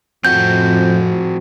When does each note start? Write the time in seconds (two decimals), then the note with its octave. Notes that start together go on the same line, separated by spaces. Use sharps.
0.25 F2 A2 F3 C4 F#4 G6